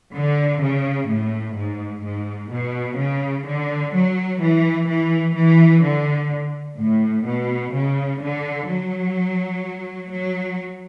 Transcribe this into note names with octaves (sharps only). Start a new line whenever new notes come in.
D3
C#3
A2
G#2
G#2
B2
C#3
D3
F#3
E3
E3
E3
D3
A2
B2
C#3
D3
F#3
F#3